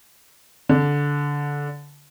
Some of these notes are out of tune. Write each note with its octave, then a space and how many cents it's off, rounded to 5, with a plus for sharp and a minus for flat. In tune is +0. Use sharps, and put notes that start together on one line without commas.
D3 -20